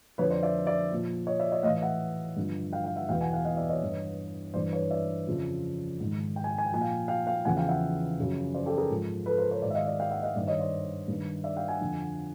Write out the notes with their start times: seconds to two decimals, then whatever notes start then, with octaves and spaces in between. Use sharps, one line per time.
0.18 F2 D3 F3 B4 C#5
0.30 C5 D5
0.43 D5 E5
0.66 D5 E5
0.91 A#2 F3
1.27 C#5 D#5
1.39 D5 E5
1.51 C#5 D#5
1.63 A2 E3 D#5 F5
1.82 E5 F#5
2.36 G2 D3 F3
2.73 F5 G5
2.84 F5 G5
2.96 E5 F#5
3.09 E2 B2 F5 G5
3.21 F#5 G#5
3.33 F5 G5
3.45 D#5 F5
3.57 D5 E5
3.69 C#5 D#5
3.82 G2 E3
4.54 G2 E3 C5 D5
4.73 B4 C#5
4.90 D5 E5
5.28 F2 C#3 F3
6.00 G#2 D#3
6.36 G5
6.44 G#5
6.51 G5
6.58 G#5
6.66 G5
6.72 A#2 F3 G#5
6.81 F5 G5
7.08 F5 G5
7.26 F5 G5
7.45 E2 C#3 F3 F#5 G#5
7.57 F5 G5
7.69 E5 F#5
8.18 F#2 C#3 F3
8.54 C5 D5
8.66 G4 A4
8.77 G#4 A#4
8.90 G#2 F3
9.26 A4 B4
9.38 A#4 C5
9.51 B4 C#5
9.62 G#2 C5 D5
9.66 D#3 E5
9.75 D#5 F5
9.86 D5 E5
10.00 F5 G5
10.11 E5 F#5
10.23 D#5 F5
10.35 G2 D#3 D5 E5
10.47 C#5 D#5
10.59 C5 D5
11.08 G2 D#3
11.44 D5 E5
11.57 F5 G5
11.68 F#5 G#5
11.81 F2 D3 F3